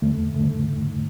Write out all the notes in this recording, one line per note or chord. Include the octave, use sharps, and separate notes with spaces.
E2 D3 A3
D3 A3